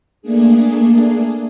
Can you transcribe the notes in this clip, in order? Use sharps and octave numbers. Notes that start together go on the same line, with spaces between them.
A3 A#3 D4 G#4